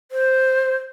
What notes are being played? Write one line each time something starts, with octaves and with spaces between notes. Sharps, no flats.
C5